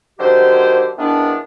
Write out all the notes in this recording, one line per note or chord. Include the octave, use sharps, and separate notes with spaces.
D3 D#3 F#3 G4 C5
E2 D#3 E3 B3 D4